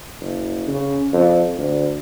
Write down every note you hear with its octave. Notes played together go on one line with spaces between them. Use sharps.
F#1
C#3
F2
D2